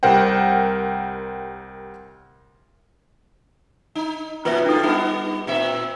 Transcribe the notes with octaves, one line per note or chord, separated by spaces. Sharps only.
C2 G3 A#4 C5 F#5 G5
D#4
F#2 B2 A#3 F4 B4 E5
F#2 G#3 D4 D#4 F4 A4
G3 B3
A#2 C4 E5